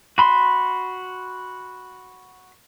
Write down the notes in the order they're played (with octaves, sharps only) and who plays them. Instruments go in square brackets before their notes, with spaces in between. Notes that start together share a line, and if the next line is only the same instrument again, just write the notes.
[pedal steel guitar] F#4 B5 C6